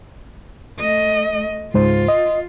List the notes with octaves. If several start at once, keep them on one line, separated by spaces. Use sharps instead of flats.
A3 D#5
C#2 G#2 F4 C5
D#5